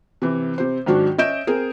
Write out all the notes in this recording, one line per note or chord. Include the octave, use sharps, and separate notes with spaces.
C3 E3
C3 C5
G#2 D#3 F#3 D4 F#4
C#4 D#5 E5 G6 D7 E7
C4 G#4 A#4